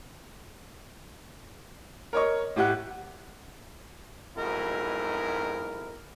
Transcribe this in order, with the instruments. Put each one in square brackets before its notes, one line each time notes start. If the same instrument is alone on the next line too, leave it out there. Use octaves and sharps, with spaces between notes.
[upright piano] A#4 C#5 D#5 C#6
A2 G4 F#5 F#6
[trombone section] B1 F2 G#2 B2 E4 A#4